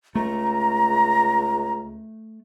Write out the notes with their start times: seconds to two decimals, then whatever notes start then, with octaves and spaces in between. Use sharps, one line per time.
0.15 C#2 A3 A#5